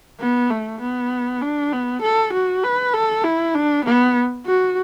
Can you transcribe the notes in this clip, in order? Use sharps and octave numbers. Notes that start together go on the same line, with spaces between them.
B3
A3
B3
D4
B3
A4
F#4
B4
A4
E4
D4
B3
F#4